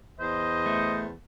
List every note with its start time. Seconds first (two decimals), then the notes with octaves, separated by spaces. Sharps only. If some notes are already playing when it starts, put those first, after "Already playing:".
0.20 E2 C5 D#5
0.66 A3